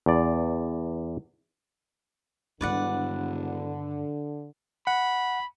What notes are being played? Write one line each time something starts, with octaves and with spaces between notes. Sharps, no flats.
E2 D5
E1 G2 D3 D#3 B4 D5 F#5
F#5 B5